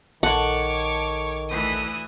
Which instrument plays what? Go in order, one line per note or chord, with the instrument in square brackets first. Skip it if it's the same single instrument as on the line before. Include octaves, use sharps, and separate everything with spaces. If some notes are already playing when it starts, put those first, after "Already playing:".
[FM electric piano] A#1 A4 A5 [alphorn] D#3 [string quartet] C#5 C#6 D6 [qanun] F#5
[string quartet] D2 E3 D#6